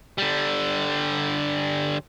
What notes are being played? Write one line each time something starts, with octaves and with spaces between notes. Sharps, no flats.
D3 G3